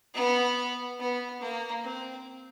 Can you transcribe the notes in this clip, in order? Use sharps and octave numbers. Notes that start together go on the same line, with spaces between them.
B3
B3
A#3
C4